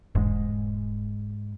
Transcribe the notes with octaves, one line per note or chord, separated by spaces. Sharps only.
E1 G#2 G#3